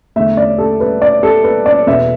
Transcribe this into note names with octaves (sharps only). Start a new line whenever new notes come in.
E2 D3 A3 E5
D5
A4
B4
D5
A4
B4
D5
E2 B2 B3 E5